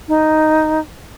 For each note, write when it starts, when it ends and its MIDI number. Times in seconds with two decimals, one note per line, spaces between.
0.08 0.80 63